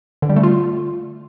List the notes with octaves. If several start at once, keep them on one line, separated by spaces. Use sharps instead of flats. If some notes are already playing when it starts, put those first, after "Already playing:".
D3
G3
A3
F4